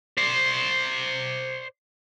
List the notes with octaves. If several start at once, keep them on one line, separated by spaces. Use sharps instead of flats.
C5 D5